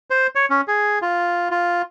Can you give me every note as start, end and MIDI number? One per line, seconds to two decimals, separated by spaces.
0.10 0.27 72
0.35 0.46 73
0.50 0.61 61
0.68 0.99 68
1.02 1.48 65
1.51 1.82 65